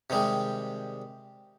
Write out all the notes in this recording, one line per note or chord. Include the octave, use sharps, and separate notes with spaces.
C3 D#3 G3 G#3